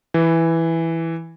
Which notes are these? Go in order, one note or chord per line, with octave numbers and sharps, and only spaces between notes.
E3